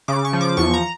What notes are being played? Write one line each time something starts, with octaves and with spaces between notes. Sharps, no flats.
C#3 D6
C#6
F3
D6
E2 C#6
A#5